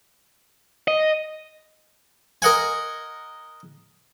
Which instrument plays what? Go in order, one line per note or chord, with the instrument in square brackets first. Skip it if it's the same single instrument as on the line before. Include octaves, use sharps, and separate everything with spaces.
[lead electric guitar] D#5
[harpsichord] A#4 D#5 F#5 G#5